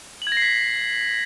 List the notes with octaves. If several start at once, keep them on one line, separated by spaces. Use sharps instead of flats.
F#7
G#6
A#6
C7
B6